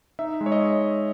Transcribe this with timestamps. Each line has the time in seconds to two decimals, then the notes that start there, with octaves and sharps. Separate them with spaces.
0.19 D#4 E5
0.41 G#3
0.46 C#5
0.52 D#5